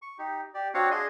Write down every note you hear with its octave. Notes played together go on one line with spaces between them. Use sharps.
C#6
D#4 G4
G4 D5
C4 D4 F#4 C#5 F5 F#5
D4 G#4 D#5 G#5 C6